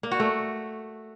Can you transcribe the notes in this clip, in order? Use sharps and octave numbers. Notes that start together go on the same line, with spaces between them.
A#3
F#4
A3